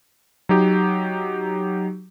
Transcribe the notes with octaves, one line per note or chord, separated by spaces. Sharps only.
F#3 D#4 G4